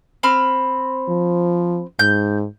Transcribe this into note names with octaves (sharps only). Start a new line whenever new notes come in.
C4 B5 F6
F3
G#2 G6